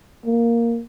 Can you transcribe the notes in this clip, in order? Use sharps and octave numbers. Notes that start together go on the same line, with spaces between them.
A#3